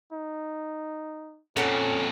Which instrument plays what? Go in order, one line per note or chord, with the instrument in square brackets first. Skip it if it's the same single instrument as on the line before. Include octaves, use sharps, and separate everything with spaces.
[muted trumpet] D#4
[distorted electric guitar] F2 A#2 [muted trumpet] C#4 [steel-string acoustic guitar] A4 F#5 G5